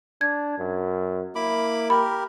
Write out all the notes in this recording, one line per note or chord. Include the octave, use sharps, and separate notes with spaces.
D4 G#6
F#2
A#3 E4 B5 D6
G4 A#4 B5